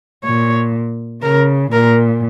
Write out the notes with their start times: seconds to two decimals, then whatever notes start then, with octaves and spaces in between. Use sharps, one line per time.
0.24 A#2 C#5
1.22 C#3 A#4
1.72 A#2 A#4